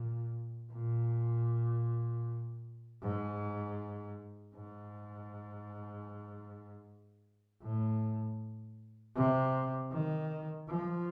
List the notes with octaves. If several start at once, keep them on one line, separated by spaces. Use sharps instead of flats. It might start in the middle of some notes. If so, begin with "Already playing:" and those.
Already playing: A#2
A#2
G#2
G#2
A2
C3
D#3
F3